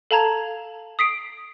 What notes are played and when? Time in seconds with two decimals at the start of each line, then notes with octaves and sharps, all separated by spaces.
0.11 A4 F5 A5 A#5 G#6
0.99 D#6 B6 C7 D7